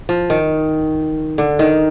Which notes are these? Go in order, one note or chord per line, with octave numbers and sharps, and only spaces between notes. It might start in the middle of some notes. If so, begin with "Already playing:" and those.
F3
D#3
D3
D#3